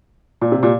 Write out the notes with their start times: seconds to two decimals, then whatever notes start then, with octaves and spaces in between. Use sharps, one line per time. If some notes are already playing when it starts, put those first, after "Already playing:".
0.41 A#2
0.52 C3
0.63 A#2